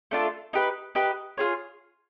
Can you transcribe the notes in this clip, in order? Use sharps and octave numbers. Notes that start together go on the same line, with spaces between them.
A3 D4 F4 A4
D#4 G4 B4
D#4 G4 B4
F4 G#4 C#5